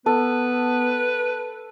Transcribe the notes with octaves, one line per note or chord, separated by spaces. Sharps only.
B3 A4 B4